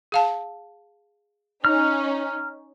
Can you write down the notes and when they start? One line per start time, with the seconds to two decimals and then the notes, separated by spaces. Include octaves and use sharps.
0.12 G#4 F5 A5
1.65 C#4 D#4 A#5 F6